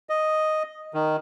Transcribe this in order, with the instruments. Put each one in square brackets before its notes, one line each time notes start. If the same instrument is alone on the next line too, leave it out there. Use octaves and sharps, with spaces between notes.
[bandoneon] D#5
D#3